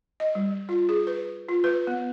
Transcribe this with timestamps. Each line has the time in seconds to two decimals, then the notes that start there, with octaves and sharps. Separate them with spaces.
0.20 D#5
0.35 G3
0.69 F4
0.89 G#4
1.07 B4
1.49 F4
1.64 B4
1.87 B3